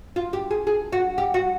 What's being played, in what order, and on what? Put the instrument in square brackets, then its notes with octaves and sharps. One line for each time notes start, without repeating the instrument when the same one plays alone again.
[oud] F4
G4
G#4
G#4
F#4
G4
F#4